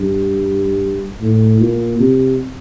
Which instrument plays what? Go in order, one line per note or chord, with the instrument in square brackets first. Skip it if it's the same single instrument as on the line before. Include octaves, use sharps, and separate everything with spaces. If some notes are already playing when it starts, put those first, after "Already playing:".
Already playing: [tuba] G2
A2
A#2
C3